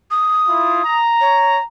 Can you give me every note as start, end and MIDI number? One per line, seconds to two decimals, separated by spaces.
0.11 0.96 87
0.48 0.83 64
0.48 0.83 65
0.85 1.64 82
1.21 1.56 73